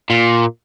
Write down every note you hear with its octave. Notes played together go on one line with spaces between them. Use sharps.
A#2